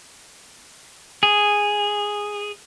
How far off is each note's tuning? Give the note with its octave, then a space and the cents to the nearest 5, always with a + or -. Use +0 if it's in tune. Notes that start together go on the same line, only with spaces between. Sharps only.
G#4 -5